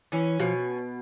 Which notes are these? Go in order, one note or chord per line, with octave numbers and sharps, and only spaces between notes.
E3 C#4
B2 F3